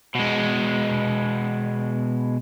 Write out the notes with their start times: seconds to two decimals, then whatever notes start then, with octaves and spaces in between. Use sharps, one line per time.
0.15 B2 G#3